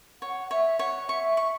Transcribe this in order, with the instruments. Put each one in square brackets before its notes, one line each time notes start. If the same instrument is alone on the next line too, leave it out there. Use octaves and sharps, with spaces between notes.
[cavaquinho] C#5 [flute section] F#5
[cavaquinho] C#5 [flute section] E5
[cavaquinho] C#5 [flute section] F#5
[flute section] E5 [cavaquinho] C#6
[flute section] E5 [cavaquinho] C#6